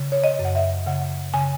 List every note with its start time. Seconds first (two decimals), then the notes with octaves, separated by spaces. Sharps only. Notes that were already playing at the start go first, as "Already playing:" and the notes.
Already playing: C#3
0.12 C#5
0.24 D#5
0.39 F#2
0.45 F#5
0.55 E5
0.87 C#3 F#5
1.34 C#3 G#5